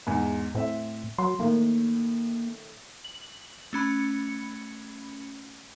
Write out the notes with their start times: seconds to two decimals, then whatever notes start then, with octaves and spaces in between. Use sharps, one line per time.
0.07 E2 G#2
0.55 A2 C4 E5
1.18 F#3 C6
1.39 A2 D#3 A#3
3.04 F#7
3.73 A3 C#4 B5 C#7